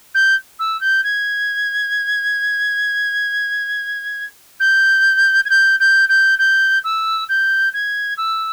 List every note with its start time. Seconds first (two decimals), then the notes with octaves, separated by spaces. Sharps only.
0.14 G6
0.59 E6
0.81 G6
1.03 G#6
4.60 G6
5.45 G#6
5.50 G6
5.79 G6
6.09 G6
6.38 G6
6.84 E6
7.29 G6
7.73 G#6
8.17 E6